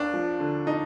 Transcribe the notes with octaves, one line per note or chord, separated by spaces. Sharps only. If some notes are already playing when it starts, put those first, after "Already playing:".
Already playing: D#2 D4
F3
D3
D#4